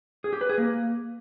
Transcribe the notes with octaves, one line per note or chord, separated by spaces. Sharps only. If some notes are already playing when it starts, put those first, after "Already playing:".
G#4
G4
B4
G#4
A#3